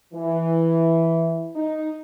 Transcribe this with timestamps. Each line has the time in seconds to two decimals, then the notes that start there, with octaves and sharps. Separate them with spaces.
0.13 E3
1.55 D#4